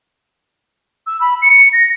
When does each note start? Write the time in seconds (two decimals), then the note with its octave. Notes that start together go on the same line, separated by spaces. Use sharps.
1.07 E6
1.21 B5
1.42 C#7
1.73 A#6